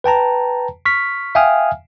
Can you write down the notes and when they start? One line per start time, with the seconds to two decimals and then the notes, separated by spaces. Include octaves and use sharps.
0.04 B4 G5 A5 A#5
0.85 C#6 F6 B6
1.35 E5 F5 G5 G#5 D#6 F6